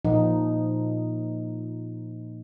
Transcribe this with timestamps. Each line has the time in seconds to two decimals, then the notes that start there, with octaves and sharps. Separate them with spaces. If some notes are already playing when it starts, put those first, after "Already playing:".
0.05 A#2 F3 D#4